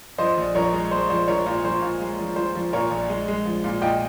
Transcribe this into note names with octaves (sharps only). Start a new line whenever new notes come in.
F3 C5 D#5
A#1
F3 A#4 C#5
G#3
G#3 C5
F3 C5
F3 A#4 C#5
A#2 C5
F3 C5
A#2
G#3
F3
F3 C5
F3
A#2 A#4 C#5
A#1
G#3
G#3
F3
A#2
A#2 D#5 G5